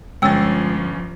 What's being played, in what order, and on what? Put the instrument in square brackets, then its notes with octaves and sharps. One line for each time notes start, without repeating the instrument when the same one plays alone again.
[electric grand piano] G1 C#4 A6 [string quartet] F3 [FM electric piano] G#3 [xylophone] G5 E6